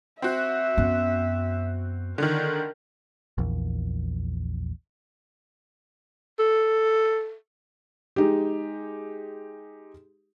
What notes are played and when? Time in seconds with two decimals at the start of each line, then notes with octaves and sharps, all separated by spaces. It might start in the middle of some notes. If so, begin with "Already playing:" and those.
0.22 C4 F#4 E5
0.78 F#2 B3
2.18 D3 D#3 A#4
3.38 A#1 E2
6.39 A4
8.16 G#3 D#4 G4